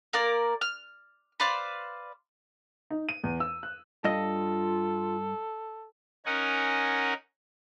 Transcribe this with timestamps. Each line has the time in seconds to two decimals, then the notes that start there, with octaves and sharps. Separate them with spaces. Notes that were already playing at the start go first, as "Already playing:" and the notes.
0.13 A#3 A#4 D5
0.61 F6
1.40 B4 C5 D5 F5
2.90 D#4
3.09 D#7
3.24 E2
3.40 E6
3.63 F#6
4.04 G2 F4 A4 D#5
6.26 C#4 D#4 A#4 F#5 G#5